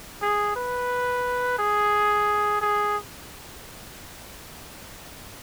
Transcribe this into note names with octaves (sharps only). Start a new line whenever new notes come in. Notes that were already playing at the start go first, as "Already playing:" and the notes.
G#4
B4
G#4
G#4